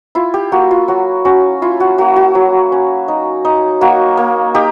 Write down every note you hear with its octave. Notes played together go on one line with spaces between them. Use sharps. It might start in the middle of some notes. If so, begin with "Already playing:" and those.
E4 F4
G4
A#3 F#4
F4
F#3 F#4
C#4 F#4
E4 F4
F#4
A#3 F#4
F#4
F#3
C#4
D#4
D#4
A#3 F#4
A#3
D#4 G4